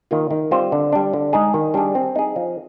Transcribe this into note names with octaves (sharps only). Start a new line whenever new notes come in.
D#3 A#3 F4
D#3
G3 C4 F4 C5
D3
G3 D4
D3
G#3 D#4 G#4
D#3
G3 D4 G#4
C4
D#4 G#4
F3